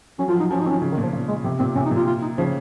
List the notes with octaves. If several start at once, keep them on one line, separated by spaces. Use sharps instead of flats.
F#3 C#4
F3 F4
F#3
D#4
F3 C#4
D#4
D#3 C4 C#4
C#3
D#3
A#2
F3
A#2
G#3
C3
A#2 C4
C3 C#4
D#4
A#2
F4
F4
D#4
C#3 F3